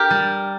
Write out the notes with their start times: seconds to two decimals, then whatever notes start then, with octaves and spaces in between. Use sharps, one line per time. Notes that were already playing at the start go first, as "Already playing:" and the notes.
Already playing: G4 A#4
0.10 G3